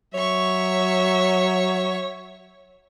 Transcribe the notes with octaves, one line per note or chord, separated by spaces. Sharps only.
F#3 C#5 E5 C#6